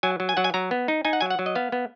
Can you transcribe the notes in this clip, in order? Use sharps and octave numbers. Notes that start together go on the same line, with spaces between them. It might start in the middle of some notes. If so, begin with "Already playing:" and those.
F#3 G#5
F#3
G#5
F#3 F#5
G#5
F#3 A#5
B3
D#4
D#4 G#5
F#5
F#3 G#5
F#5
F#3
D#5
B3 F5
B3